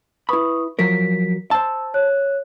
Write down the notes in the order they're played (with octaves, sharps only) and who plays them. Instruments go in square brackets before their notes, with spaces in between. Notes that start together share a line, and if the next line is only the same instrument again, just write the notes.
[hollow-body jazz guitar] E4 B5 [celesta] B4 C#6 D#6
[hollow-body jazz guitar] F3 F#3 A#4 [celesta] B6
[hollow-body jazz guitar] C5 A5 [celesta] E6
[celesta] C#5 F#6